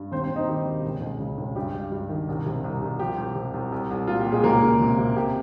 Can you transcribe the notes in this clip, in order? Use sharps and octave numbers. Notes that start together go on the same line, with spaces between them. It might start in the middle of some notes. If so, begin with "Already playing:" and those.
Already playing: G2
D#2 C4 C5
C4 C5
D#2
D#4 D#5
D#3 G4
D#2
C#2
C#2
C#3
C#2
G2 G4
G2
G2
D#3
C2
C3
C2
C2
F3 G4
C2
C3
C2
C2
C2
A#2 F4
G4
A#2
G#3 G#4
C#2 A#3 A#4
C#2
C3
C3
C3 G4